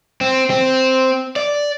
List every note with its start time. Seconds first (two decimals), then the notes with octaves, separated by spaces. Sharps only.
0.21 C4
0.50 C4
1.36 D5